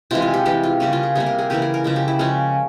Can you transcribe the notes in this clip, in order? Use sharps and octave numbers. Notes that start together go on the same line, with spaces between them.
C3 E3 G#3 F4
F4
G4
E3 G#3 G4
F4
C#3 G3 A#3 C#4
F4
G#4
C3 G3 A#3 G#4
A#4
G#4
C#3 E3 A#3 G4
G#4
A#4
C#3 F3 G#3
G4
E4
C#3 F3 G#3 C#4